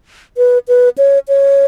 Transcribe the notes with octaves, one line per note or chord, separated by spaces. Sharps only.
B4
B4
C#5
C#5